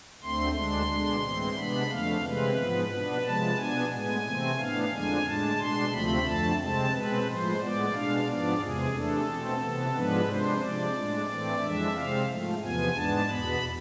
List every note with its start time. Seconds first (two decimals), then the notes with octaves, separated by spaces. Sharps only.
0.23 D2 D3 A3 C4 C6
0.55 D2 D3 G#3 D4 C6
0.89 B2 G#3 D4
1.22 A2 E3 G#3 C4
1.56 C3 G#3 B3 D4 B5
1.89 F2 D3 A3 F5
2.23 C3 E3 G#3 C4 B4
2.57 G#2 F3 B3
2.91 B2 B3 D4
3.23 C3 F3 G#3 A5
3.57 B2 B3 D4 G#5
3.90 A2 G#3 B3 G#5
4.24 C3 E3 A3 C4
4.58 A2 E3 B3 D4 F5
4.91 F2 D3 G#3 D4 G#5
5.24 A2 G#3 D4 A5
5.58 B2 G#3 D4 C6
5.91 D2 C3 F3 A3 C4 B5
6.25 F2 D3 A3 A5
6.59 C3 G#3 C4 A5
6.92 B2 G#3 C4 B4
7.25 A2 F3 G#3 C5
7.60 A2 G#3 B3 D5
7.93 B2 G#3 D4 F5
8.26 G#2 F3 B3 D4 D5
8.60 E2 C3 G#3 G#4
8.93 C3 E3 A3 D4 A4
9.27 B2 A3 C4
9.61 C3 E3 B3
9.93 G#2 F3 G#3 B3 D4 B4
10.27 C3 G#3 D4 C5
10.60 C3 F3 G#3 D4 D5
10.94 A2 G#3 D4
11.28 A2 E3 A3 C4
11.61 F2 E3 G#3 D4 E5
11.95 C3 G#3 C4 F5
12.28 G#2 F3 A3
12.62 E2 C3 F3 B3 G#5
12.95 G#2 G#3 B3 D4 A5
13.29 E2 B2 B3 B5